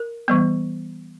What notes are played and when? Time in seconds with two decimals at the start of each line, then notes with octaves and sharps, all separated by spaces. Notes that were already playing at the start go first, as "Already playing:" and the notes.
Already playing: A#4
0.28 E3 G3 B3